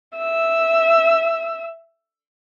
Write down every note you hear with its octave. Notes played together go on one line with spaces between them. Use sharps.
E5 E6